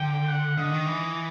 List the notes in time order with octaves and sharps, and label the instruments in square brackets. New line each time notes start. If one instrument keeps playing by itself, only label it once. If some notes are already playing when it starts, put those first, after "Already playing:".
Already playing: [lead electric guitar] D3 [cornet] G5
[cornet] F#5
[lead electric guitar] D3 [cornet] D#5
[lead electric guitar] D#3
E3